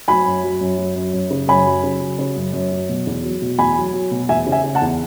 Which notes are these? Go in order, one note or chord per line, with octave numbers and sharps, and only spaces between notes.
F#3 G#5 B5
F#2
F#3
F#2
F#3
F#2
F#2
C#3
F#2 G#5 B5
F#3
C#3
F#3
C#3
F#2
F#2
F#3
B2
E2
F#3
B2
E2 G#5 B5
F#3
F#3
B2
E2 E5 G#5
C#3
E5 G#5
C#3
F#5 A5
E2